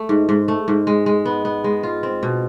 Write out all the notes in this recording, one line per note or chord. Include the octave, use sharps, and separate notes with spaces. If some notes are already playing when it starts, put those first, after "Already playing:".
Already playing: A3
G#2
G#2
A3
G#2
G#3
G#3
B3
B3
G#3
F4
C4
B2